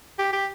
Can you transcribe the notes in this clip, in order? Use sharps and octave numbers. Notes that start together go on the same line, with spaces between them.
G4
G4